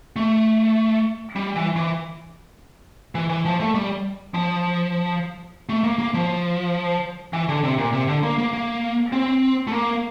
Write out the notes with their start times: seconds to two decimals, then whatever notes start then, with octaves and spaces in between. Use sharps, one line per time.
0.16 A3
1.36 G3
1.56 E3
1.76 E3
3.15 E3
3.29 E3
3.45 F3
3.60 A3
3.74 G3
4.34 F3
5.69 A3
5.84 A#3
5.99 A#3
6.14 F3
7.33 E3
7.49 D3
7.63 C3
7.78 A#2
7.93 C3
8.08 D3
8.23 A#3
8.38 A#3
8.53 A#3
9.12 C4
9.67 A3
9.72 A#3